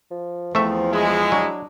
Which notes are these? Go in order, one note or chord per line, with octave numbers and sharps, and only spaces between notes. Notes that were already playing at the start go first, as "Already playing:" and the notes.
F3
E2 F3 A3 C4 E5
G#3 E4 G#4
F#3 D4